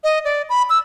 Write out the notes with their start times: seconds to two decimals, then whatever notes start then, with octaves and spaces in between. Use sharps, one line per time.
0.04 D#5
0.25 D5
0.49 B5
0.70 E6